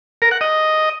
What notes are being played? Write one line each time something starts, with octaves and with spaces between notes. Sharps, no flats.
A#4
F#5
D#5